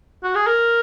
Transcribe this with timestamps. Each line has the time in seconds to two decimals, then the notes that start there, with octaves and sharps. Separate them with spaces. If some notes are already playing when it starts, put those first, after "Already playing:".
0.23 F#4
0.35 G#4
0.47 A#4